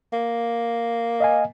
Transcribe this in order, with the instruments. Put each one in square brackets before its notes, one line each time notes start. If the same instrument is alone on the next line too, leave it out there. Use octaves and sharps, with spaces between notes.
[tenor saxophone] A#3
[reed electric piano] D#5 F5 G#5